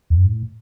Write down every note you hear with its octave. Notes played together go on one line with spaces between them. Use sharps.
E2
F#2
G#2
A2